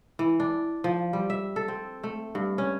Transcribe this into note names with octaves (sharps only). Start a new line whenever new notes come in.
E3
D4
F3
G3
E5
A4
C4
A3
G2
C#4